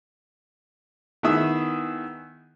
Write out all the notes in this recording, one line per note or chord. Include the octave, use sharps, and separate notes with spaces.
D#3 B3 E4 G#4 E5 D#6